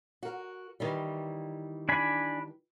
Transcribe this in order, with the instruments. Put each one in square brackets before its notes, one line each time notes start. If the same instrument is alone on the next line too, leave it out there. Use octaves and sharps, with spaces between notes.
[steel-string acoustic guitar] F#4 A#4
D#3 E3 G3
[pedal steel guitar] D4 G#5 B5